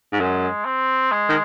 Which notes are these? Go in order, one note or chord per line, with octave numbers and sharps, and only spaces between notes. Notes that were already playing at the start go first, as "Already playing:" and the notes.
G#2
F#2 G#3
C4
G#3
D#3